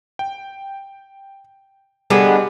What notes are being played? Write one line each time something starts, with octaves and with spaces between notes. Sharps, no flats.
G5
D3 G3 G#3 B3 D6